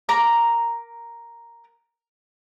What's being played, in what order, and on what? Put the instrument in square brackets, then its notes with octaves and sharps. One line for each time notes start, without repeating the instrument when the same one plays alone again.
[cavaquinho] A#4 A#5 D6